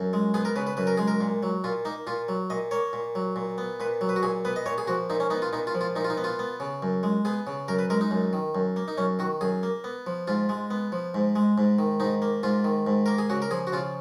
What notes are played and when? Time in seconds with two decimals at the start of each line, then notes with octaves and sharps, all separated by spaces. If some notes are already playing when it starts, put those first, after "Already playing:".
Already playing: F#2
0.13 G#3
0.34 B3 G#4
0.45 A#4
0.56 C#3 B4
0.67 B4
0.77 F#2 B4
0.87 A#4
0.97 G#3 G#4
1.08 A#4
1.21 A#2
1.43 F#3
1.64 A#2 F4
1.85 A#3 D#4
2.07 A#2 F4
2.28 F#3
2.50 A#2 D#5
2.71 A#3 C#5
2.93 A#2
3.15 F#3
3.36 A#2
3.58 B3
3.80 A#2 B4
4.01 F#3
4.09 B4
4.16 F#4
4.23 A#2 G#4
4.45 B3 B4
4.56 D#5
4.66 A#2 C#5
4.78 G#4
4.87 F3 F#4
5.10 A#2 D#4
5.20 C#4
5.30 B3 D#4
5.42 F4
5.53 A#2 D#4
5.67 F4
5.75 F3
5.81 F4
5.96 A#2 D#4
6.05 F4
6.10 D#4
6.17 B3
6.24 F4
6.39 B3
6.60 C#3
6.82 F#2
7.03 G#3
7.25 B3 G#4
7.47 C#3
7.68 F#2 A#4
7.79 B4
7.90 G#3 A#4
8.01 D#4
8.11 F#2
8.33 D#3
8.55 F#2
8.76 A#3
8.88 D#4
8.98 F#2 C#4
9.19 D#3 F#4
9.41 F#2 G#4
9.63 A#3
9.84 B3
10.07 F3
10.28 G#2 F4
10.49 G#3
10.71 B3
10.92 F3
11.15 G#2
11.36 G#3
11.58 G#2
11.79 D#3
12.00 G#2 D#4
12.22 A#3
12.43 G#2 F4
12.64 D#3
12.87 G#2
13.06 A#3 A#4
13.18 G#4
13.30 C#3 F#4
13.42 A#4
13.51 F3 G#4
13.67 F#4
13.72 C#3 F4